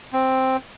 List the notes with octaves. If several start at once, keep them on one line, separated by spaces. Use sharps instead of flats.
C4